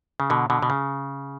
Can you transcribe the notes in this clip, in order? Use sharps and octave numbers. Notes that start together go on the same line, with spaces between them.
C#3
B2 D3
B2 D3
B2
C#3